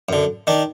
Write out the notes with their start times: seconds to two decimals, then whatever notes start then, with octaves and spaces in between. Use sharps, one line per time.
0.09 F#2 D3
0.47 D#3 D4